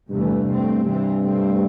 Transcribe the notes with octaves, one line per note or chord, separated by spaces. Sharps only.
E2 G2 C3 E3 A3
C3 A3 C4
G2 C3 E3 C4
C3 A3 C4